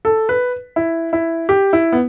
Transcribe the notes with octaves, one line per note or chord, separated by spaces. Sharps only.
A4
B4
E4
E4
G4
E4
B3